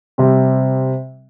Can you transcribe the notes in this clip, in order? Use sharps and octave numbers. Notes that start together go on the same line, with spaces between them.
C3 G3 C4